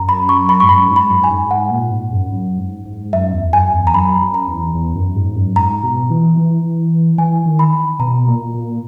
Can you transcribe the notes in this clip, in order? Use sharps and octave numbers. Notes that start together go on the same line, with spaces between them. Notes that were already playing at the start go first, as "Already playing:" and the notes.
Already playing: F#2 A#5
B5
C#6
B5
G#2 C#6
F#2 B5
G#2
B5
F#2
G#5
G#2
G#2 F#5
A#2
G#2
F#2
F#2
G#2
G#2
F#2 E5
E2
F#2 G#5
E2
A#5
F#2 B5
F#2
A#5
E2
E2
F#2
G#2
F#2
G#2 A#5
B2
E3
E3
E3 G#5
D#3
B5
B2 A#5
A#2
A#2